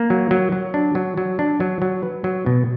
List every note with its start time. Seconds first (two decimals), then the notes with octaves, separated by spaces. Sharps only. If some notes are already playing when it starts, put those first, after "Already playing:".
Already playing: A#3
0.10 F#3
0.31 F#3
0.52 F#3
0.74 D4
0.95 F#3
1.17 F#3
1.39 D4
1.60 F#3
1.82 F#3
2.03 B4
2.24 F#3
2.46 B2